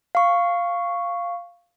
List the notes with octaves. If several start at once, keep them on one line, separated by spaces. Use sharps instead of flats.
F5 C#6